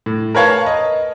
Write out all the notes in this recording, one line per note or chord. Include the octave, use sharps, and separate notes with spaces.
A2
A#4 B4 C#5 F5 A5
D#5